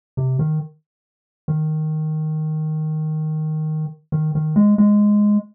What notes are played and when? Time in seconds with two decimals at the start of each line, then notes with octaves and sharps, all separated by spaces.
0.17 C3
0.39 D#3
1.48 D#3
4.12 D#3
4.35 D#3
4.56 G#3
4.78 G#3